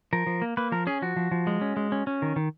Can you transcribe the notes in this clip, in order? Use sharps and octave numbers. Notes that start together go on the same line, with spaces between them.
F3 A#4
F3
A#3
A#3 B4
F3 A#4
C#4 G#4
F3 F#4
F3
F3
G#3
C#4
G#3
C#4
C#4
D#3
D#3